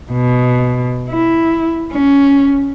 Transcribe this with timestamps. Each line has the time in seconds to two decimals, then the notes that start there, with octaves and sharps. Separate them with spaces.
0.12 B2
1.10 E4
1.92 C#4